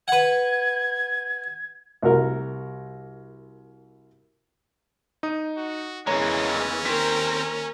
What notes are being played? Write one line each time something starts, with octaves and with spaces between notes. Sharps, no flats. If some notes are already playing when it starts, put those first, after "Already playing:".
B4 F#5 G#6
C2 F#4 A#4
D#4 D#6
F#4
E2 C#3 E3 G#3 A#3 C#4 C#5 A#5
D#2 C4 A#4 C5 A#5 B6